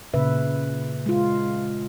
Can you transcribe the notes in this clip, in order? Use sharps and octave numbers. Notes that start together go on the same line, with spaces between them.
A#2 C#3 B4 E5
G#3 F4